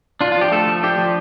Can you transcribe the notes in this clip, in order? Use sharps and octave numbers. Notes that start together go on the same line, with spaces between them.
D4 F4
F4
F3 G4
A3 A4
F3
D4 G4
F3